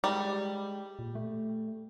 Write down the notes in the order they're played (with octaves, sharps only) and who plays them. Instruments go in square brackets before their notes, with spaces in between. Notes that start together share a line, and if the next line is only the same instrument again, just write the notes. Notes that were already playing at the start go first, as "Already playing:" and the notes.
[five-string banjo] G3 [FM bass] G#3
[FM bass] A#2
A3